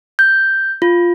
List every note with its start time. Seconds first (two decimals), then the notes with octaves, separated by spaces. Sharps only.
0.19 G6
0.82 F4